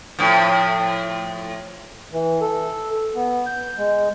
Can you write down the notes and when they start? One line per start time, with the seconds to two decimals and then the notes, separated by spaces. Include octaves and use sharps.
0.19 A2 F3
2.13 E3
2.41 A4
3.15 B3
3.47 G6
3.78 G#3